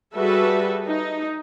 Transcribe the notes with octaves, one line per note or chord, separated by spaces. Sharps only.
G3 F#4 G#4 A4 B4 E5
D#4